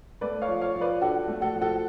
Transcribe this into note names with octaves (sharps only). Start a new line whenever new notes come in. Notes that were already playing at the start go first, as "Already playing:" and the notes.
A3 B4 D5
C#5 F5
F3
C#5 F5
F3
B4 D5
D4 F#4 A4
A3
F#4 A4
F3
F#4 A4